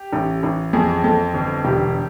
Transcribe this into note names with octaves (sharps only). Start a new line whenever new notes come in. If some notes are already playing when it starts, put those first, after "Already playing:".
Already playing: G4
A1
A1
F2 G#4
F2 A4
G1
E1 G4